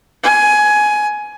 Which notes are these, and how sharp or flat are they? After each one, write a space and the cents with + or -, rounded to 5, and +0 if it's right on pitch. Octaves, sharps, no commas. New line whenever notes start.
G#5 +15